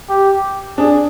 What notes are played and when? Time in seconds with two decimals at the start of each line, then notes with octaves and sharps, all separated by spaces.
0.10 G4
0.78 D4 G#4